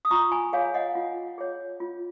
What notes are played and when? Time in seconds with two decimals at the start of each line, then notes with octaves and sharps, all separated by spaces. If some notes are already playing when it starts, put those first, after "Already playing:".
0.05 D#6
0.11 F4 A#5 C#6
0.32 G#5 B5
0.53 G#4 C#5 F5 G#5
0.74 D#5 F#5
0.95 F4
1.38 G#4 C#5
1.80 F4